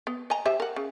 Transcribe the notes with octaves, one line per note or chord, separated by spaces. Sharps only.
B3
D#5 G#5 A#5
G4 C5 E5
A#4 F#5
C#3